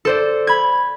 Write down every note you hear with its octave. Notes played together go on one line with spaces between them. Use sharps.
A4 C5 D5
B5 G#6